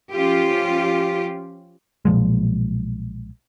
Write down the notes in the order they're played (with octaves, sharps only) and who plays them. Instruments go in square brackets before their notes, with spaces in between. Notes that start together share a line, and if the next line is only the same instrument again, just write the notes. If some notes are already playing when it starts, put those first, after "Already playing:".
[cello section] F3 C#4 F4 G4
[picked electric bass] B1 A#2 F3 G#3